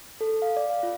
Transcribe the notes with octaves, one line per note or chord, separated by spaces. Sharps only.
A4
F5
D5
F5
F4